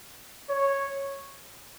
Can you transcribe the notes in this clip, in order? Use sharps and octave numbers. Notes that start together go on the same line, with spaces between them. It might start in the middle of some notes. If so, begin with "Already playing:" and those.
C#5